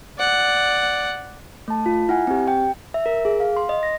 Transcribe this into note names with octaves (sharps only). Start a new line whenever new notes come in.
D5 F#5
A3 A5
F4
E4 F#5 G#5
C4 G4
G5
E5
A#4
G#4
F5
C6
D#5
A#6